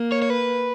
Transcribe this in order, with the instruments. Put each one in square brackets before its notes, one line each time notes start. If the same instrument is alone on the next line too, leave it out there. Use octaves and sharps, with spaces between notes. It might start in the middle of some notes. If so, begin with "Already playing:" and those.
Already playing: [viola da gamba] A#3
[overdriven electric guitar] C#5
C#5
B4